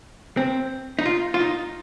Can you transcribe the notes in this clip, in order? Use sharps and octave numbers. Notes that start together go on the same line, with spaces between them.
C4
D#4
F4
F4
D#4